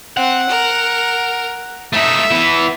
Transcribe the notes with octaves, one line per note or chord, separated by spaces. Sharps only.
C4 F#5
A#4
A3 D#4 E5
E3 B3